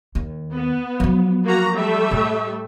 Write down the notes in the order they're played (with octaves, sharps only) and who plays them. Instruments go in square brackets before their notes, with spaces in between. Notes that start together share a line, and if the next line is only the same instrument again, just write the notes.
[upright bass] D#2
[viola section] B3
[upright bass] F3 F#3
[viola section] A#3 F#4 A#5
G3 A3 E5
[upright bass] A2